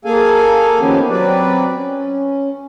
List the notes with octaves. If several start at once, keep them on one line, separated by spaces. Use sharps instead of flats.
A#3 G#4 A4 F5 G#5
D#3 F3 B3 C#4 G4
F#3 C4 B4 D5
C#4